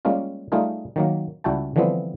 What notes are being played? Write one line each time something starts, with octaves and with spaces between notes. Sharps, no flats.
G3 G#3 A#3 C#4 F4
G3 A3 D#4 F4 G#4 A#4
D#3 F#3 A#3
C#2 G3 E4 F#4 G5 A5
D3 E3 F3 G3 B3 C4